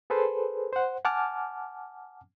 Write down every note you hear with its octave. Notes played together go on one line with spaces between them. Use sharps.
G#4 A4 B4 C5
C5 F#5
F#5 G#5 A5 D6 F6